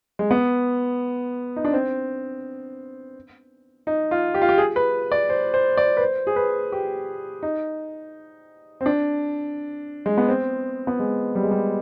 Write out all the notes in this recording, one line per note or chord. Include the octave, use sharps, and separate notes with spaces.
G#3
B3
D#4
D4
C4
D#4
F4
G4
F4
G4
G#4
B4
D5
C5
C5
D5
B4
C5
G#4
B4
G4
D#4
C4
D4
G#3
B3
C4
B3
G#3
G3
G#3
G3